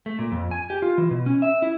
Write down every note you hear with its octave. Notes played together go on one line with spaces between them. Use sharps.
A3
A#2
F2
G#5
G4
F4
E3
B2
C#4
E5
E4